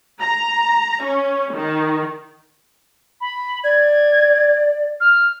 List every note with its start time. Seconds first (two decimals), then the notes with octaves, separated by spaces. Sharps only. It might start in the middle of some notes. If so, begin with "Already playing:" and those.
0.21 A#5
1.05 C#4
1.55 D#3
3.21 B5
3.64 D5 G#6
5.00 F6